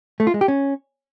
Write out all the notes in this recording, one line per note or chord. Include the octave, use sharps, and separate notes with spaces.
A3
F4
G#3
G4
C#4